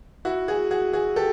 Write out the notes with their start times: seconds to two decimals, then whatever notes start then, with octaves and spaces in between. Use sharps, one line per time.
0.25 E4 F#4
0.48 F#4 G#4
0.71 F#4 G#4
0.93 F#4 G#4
1.16 G4 A4